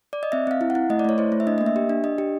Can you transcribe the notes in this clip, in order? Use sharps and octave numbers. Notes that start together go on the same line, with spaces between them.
D5
D#5
C4 E5
C4 F5
E4
F#5
E4
A3 D#5
D5
A3 C#5
E4 C5
A3
E5
D4 D#5
A#3 D#5
E5
G4
D4
D4 D#5
G4